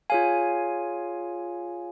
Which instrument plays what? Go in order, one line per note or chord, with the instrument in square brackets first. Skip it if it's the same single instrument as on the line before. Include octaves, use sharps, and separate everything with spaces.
[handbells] F4 G#4 C#5 F5 G#5